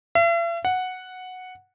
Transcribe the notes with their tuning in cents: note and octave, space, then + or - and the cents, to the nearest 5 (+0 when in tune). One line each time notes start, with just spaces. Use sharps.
E5 +45
F#5 -5